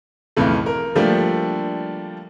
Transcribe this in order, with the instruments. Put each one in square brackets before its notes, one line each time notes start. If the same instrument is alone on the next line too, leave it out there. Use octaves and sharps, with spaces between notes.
[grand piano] B1 F2 C#3 E3 A3
A#4
D3 F3 G3 A3 A#3 D4